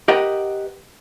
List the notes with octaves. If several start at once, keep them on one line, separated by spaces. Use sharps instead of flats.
G4 A#4 B4 D#5 F#5 G5